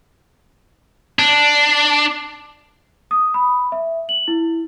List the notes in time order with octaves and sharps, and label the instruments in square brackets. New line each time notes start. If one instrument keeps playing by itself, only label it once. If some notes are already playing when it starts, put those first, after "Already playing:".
[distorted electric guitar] D4
[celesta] D#6
B5
E5
F#7
E4